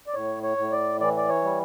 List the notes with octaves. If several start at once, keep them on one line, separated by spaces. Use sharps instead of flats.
D5
A2 C#5
C#5
A2
D5
E3 D5
D5
C#5
G3